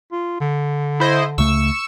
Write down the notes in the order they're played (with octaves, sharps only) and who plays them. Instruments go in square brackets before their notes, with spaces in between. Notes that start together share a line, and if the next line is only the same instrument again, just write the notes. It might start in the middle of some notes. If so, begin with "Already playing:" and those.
[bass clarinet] F4
D3
[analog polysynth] E4 C5 D#5
[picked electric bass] C#2 C#3 A3 [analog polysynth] C#6 E6